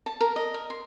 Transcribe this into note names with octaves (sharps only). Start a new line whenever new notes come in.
A5
A#4
D#5
A#4
C6